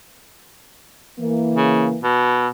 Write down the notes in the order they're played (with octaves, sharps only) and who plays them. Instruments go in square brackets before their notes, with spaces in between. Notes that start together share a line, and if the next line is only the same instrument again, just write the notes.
[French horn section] E3 A#3
[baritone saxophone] C#3
B2